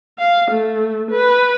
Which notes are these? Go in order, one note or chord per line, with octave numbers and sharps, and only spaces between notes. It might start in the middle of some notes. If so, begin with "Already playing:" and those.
F5
A3
B4